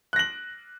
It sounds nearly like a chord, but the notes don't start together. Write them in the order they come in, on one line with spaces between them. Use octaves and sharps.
F#6 A#6 F#7